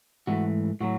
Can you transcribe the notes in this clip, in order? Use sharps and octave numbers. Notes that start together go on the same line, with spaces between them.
G#2 E3 A3 F#4
A2 F#3 F#4